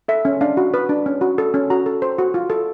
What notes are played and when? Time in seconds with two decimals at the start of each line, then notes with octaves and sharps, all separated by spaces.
0.08 A4 E5
0.25 C#4
0.41 D4 F5
0.57 F#4
0.74 B4
0.89 D4
1.06 C#4
1.21 F#4
1.38 A4
1.54 C#4
1.70 F#4 A#5
1.86 A4
2.02 C5
2.18 F#4
2.34 F4
2.50 A4